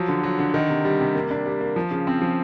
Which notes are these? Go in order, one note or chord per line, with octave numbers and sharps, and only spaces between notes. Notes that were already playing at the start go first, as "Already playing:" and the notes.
Already playing: F3 F#3
D3
F#3
D3
D#3
C3
G3
C3
A#3
D4
G3
A#3
F3
C#3
C4
F3